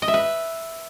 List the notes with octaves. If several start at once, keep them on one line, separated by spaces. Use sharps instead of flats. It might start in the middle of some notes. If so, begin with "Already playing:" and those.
D#5
E5
B4